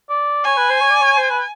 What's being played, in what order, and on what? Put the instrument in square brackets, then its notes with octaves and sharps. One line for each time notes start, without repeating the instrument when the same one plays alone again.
[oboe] D5
[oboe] C#5 [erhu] G#5
[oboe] B4
C5
C#5
D5
C#5
C5
B4